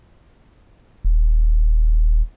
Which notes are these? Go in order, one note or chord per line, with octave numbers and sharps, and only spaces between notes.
D#1